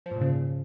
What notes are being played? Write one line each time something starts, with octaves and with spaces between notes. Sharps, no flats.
F3
G#2
A#2
C#3